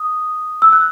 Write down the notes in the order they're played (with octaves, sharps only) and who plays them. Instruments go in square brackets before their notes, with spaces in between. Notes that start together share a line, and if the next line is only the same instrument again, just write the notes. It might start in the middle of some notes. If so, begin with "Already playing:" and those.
Already playing: [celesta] D#6
E6
F#6